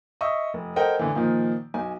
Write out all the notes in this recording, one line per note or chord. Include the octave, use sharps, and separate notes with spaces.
D#5 E5 C#6 D#6 E6
F1
A4 A#4 C5 D#5 F#5 G5
A2 D3 E3
A#2 D#3 F3
B1 G#5